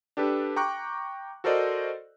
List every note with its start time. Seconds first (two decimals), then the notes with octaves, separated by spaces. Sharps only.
0.17 D4 G4 A4 B4
0.56 G5 A#5 C#6 D6 F#6
1.44 F#4 A4 A#4 C5 D5 D#5